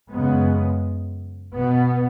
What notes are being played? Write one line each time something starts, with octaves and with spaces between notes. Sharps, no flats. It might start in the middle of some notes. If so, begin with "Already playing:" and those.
F#2 C#3 G#3 B3
B2 B3